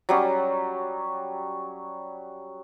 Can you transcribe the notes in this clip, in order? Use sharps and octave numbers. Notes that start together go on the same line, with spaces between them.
F#3 G3 C#4